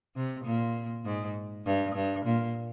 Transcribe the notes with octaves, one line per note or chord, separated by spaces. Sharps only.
C3
A#2
G#2
G2
G2
A#2